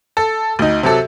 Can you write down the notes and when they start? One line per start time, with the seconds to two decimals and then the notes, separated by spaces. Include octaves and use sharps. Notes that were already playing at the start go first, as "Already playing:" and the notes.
0.17 A4
0.59 D2 D#4
0.83 C3 F#3 A4